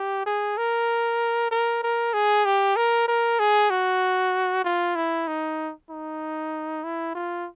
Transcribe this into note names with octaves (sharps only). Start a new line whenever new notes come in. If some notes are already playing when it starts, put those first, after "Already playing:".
Already playing: G4
G#4
A#4
A#4
A#4
G#4
G4
A#4
A#4
G#4
F#4
F4
E4
D#4
D#4
E4
F4